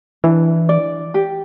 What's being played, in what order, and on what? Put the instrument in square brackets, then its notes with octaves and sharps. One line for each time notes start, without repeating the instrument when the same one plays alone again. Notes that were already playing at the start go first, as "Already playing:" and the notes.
[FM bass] E3 [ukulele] D4
[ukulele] D5
G4